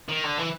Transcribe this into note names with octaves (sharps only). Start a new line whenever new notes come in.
D#3
D3
E3